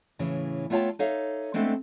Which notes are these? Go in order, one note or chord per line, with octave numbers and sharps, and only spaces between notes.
A2 C#3 E3
A3 B3 F4 C#5 G5 A5
D#4 A4 C#5 E5 F5
G#3 A3 B3 C4 D4 A4